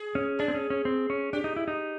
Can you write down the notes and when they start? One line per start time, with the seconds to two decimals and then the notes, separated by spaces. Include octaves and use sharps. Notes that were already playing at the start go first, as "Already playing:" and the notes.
Already playing: G#4
0.15 C#4
0.39 D4 G#4
0.48 C4
0.54 C#4
0.70 C#4
0.85 C4
1.10 C#4
1.33 D4 G4
1.44 D#4
1.56 E4
1.68 D#4